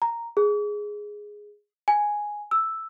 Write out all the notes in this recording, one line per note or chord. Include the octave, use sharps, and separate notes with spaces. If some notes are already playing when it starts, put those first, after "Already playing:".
A#5
G#4
G#5
E6